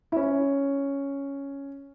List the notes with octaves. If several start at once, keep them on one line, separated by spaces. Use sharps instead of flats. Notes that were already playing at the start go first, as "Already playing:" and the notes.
E4
C#4